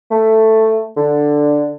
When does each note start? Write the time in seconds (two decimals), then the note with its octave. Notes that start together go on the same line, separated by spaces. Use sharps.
0.11 A3
0.97 D3